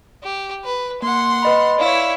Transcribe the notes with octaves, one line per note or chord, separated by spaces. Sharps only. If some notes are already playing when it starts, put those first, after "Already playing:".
G4
B4
A#3 F#5 C6
B4 D#5 B5
E4 C#5 D5 F5